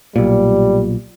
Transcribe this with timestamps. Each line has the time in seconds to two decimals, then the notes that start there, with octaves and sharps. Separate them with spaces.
0.16 B1 A#2 G3